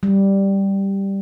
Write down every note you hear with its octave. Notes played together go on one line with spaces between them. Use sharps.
G3